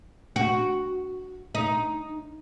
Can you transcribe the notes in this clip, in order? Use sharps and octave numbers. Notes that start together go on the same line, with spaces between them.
F#4
D#4